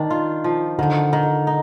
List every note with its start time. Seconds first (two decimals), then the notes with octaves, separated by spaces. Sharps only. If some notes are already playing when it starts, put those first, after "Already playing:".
Already playing: D#3 D4
0.11 F4
0.44 F3
0.79 D3 D#3
1.13 D#3
1.47 D#4